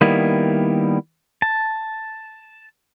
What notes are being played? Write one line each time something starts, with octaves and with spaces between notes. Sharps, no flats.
D#3 G3 A#3 B3 E4
A5